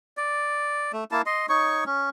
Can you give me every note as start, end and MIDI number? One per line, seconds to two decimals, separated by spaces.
0.17 0.92 74
0.93 1.04 57
1.11 1.22 58
1.11 1.22 64
1.11 1.22 81
1.26 1.46 75
1.26 1.46 84
1.49 1.84 63
1.49 1.84 73
1.49 1.84 85
1.86 2.10 61